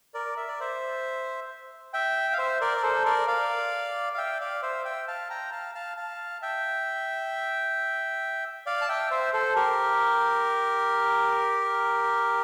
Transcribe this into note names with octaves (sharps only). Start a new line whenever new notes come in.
A#4 D5
E5
D5
C5 E5
E5 G5
F5
C5 E5
A#4 D5
D5
A4 C5
A#4 D5
D5 F5
F5
E5 G5
D5 F5
C5 E5
E5 G5
F5 A5
G5 A#5
F5 A5
F5 A5
F5 A5
E5 G5
D5 F5
A5
E5 G5
C5 E5
A4 C5
G4 A#4